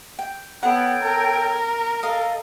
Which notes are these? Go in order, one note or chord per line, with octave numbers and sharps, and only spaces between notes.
G5
B3 A4 C#5 F#5 G5
A#4
A4 D#5 F5